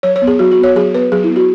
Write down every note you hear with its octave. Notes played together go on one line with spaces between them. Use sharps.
F#3 C#5
C#5
B3
G#4
F#3 F#4
F#4
B3
C#5
F#3 G#4
B3 B4
F#3 G#4
E4
B3
F#4